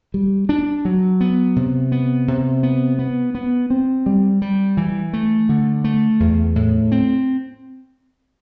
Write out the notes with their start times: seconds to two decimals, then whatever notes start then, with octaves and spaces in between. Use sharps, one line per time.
0.14 G3
0.49 D4
0.85 F#3
1.21 B3
1.56 C3
1.92 B3
2.28 C3
2.63 B3
2.99 B3
3.35 B3
3.70 C4
4.06 G3
4.42 G3
4.77 E3
5.13 A3
5.49 D3
5.84 A3
6.20 E2
6.56 A2
6.92 C4